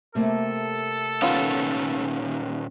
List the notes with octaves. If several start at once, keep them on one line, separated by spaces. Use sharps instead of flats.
C3 A3 A#3 A4
A#2 D#3 B3 C#4 F4